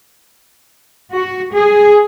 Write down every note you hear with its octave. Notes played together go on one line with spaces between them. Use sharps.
F#4
G#4